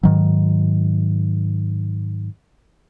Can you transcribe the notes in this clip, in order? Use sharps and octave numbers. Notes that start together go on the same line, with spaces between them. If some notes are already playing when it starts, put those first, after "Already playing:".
G#2 D#3 F#3